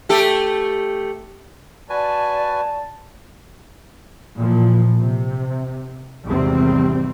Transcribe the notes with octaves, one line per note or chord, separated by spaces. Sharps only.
A3 G4 A4
F#4 B4 D5 G#5 A5
A#2 E3 F3
C3
G#1 E2 C3 G3 C4